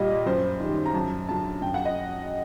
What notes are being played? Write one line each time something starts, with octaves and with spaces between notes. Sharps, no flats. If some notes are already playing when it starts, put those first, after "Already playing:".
Already playing: A#2 G3 D#5
F#2 C5
D#3 G3
A#5
F#2 A5
D3 F#3 A5
F#2 G5
F#5
D#5